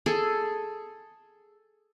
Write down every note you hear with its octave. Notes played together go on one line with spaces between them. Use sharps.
G#4 A4